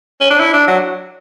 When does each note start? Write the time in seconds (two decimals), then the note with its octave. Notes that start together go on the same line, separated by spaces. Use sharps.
0.21 C#4
0.30 D4
0.40 E4
0.54 D4
0.68 F#3